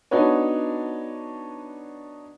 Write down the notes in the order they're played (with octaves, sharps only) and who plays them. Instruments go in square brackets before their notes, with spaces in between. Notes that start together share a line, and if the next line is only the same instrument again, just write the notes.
[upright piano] B3 D4 D#4 F#4 B4 C#5